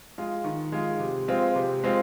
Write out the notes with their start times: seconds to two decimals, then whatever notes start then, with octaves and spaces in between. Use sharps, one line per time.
0.18 G#3 F4
0.44 D#3
0.72 G#3 F4
1.00 C3
1.28 G#3 C4 F4
1.56 C3
1.84 G#3 C4 F4